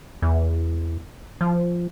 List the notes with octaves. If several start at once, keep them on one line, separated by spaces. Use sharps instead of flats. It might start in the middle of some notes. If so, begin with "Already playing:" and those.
E2
F3